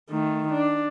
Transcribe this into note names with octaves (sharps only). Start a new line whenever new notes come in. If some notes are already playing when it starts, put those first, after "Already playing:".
D#3 A3
D4